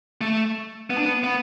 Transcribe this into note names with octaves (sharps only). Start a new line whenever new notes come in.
A3
B3
D4
B3
B3